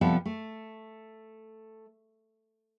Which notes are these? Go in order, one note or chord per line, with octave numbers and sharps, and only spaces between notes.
C3 F3 G3 B3 F4 A4
A3